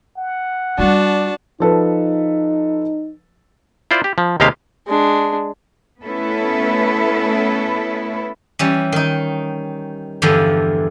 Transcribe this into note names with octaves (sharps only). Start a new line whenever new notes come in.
F#5
G3 D4 E4 F#4 A5
F3 D#4 A4 B4
E4 F4 C5 D5
G4
F3
D#2 C3 G#3 G4 D#5 F5
G#3 D4
A3 B3 C#4 E4 A4 B4
E3 G3 C#4
D#3 D#4
E2 G2 D3 E3 F3